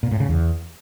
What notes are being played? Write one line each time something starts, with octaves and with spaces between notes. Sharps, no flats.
A#2
A2
C#3
E2